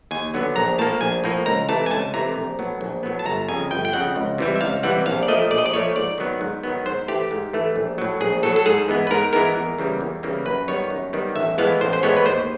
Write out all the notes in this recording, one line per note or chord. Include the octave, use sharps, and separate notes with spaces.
D#2 G#5
D3 F#3 B3
A#1 A#5
A2 F3 A#3 A5
A#1 G#5
A2 F3 A#3
C#2 A#5
C3 E3 A3 A5
G#5
C#2 A5
C3 E3 A3 A#5
A#1
A2 F#3 B3
A#1
A2 F#3 B3
A5
G1 A#5
F2 C#3 G#5
G1 G5
G5
F2 C#3 F#5
C#2
C3 E3 G3
E5
C#2 F5
C3 E3 G3 F#5
A#1 F5
D5
A#2 F3 A3 D#5
A#1 D5
D#5
D5
A#2 F3 A3 C#5
G#2 D5
D#3 F#3 B3
G#2
D#3 F#3 B3
G#2 C5
E3 A3 G4
G#2
E3 A3
A#1
A2 F#3
A#1 G#4
A2 F#3 A4
A4
G#2 G#4
E3 G#3 B3
B4
G#2 A#4
E3 G#3 B3 A#4
E2
C#3 E3 G3 A#3
E2
C#3 E3 G3 A#3
F#2 B4
D#3 G3 B3 C#5
F#2
D#3 G3 B3
A1 E5
A2 E3 G#3 B3 F5
A1 C5
C5
A2 E3 G#3 B3 C#5
B4
D#2 C5